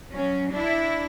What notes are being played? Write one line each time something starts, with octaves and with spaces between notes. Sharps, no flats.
F#3 C#4
D4 E4